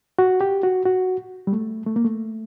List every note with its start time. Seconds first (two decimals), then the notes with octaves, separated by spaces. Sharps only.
0.19 F#4
0.41 G4
0.63 F#4
0.86 F#4
1.47 G3
1.53 A3
1.86 A3
1.96 A#3
2.04 A3